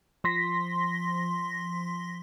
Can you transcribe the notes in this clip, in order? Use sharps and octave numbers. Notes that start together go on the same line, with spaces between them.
F3 C6 A#6 B6